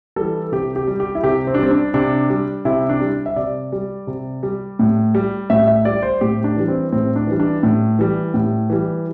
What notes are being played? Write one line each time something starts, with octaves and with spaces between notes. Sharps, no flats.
E3 G3 A4
C3 G4
G4
G3
G4
E4
C3 G4
C4
D4
G3 C4
D4
C3 D4
G3
C3 E4
D4
G3
E5
C3 D5
G3
C3
G3
A2
G3
A2 E5
E5
G3 D5
C5
A2 G4
D4
E3 G3
C4
A2 C4
D4
E3 G3
D4
A2
E3 G3
A2
E3 G3